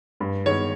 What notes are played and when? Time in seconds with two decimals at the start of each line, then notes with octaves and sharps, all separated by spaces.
0.20 G2
0.46 D#3 G#3 B3 C#5